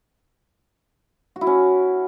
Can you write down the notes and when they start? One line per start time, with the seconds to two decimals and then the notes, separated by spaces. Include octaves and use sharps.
1.36 F#4
1.41 E4
1.47 C#4